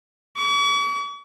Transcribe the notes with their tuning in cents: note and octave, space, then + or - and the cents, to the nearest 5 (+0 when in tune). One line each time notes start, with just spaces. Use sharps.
C#6 +45